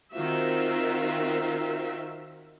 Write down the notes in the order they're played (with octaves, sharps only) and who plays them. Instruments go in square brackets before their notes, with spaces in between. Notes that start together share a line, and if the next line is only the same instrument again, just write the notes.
[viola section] D#3 C4 F4 F#4 E5